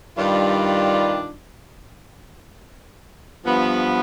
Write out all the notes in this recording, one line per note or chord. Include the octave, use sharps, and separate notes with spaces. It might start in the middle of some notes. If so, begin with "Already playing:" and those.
G2 D#3 G3 D4 F4
G2 F3 B3